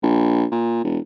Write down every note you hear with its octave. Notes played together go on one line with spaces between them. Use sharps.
A#1
A#2
E1